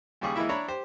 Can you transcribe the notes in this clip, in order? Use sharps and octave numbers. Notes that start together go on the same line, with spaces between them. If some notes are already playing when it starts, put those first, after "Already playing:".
D#2 C#3 G3 G#4 C#6
E3 G#3 A#3 E4 E5
D4 E4 C#5 A#5 B5
G4 C5